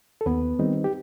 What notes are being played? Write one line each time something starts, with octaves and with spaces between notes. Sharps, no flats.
A4
D#2 B3 B4
D#3 G3 C4 D#4
G4